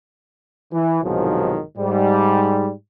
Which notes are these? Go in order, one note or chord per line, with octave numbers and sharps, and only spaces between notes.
E3
C2 G#2 B2 D#3 F3 F#3
G#2 G3